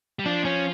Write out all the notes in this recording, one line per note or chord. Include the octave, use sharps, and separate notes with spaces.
G3
F3 D4
C#4